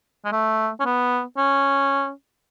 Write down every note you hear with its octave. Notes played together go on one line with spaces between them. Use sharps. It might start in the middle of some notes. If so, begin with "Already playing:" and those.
G#3
A3
C#4
B3
C#4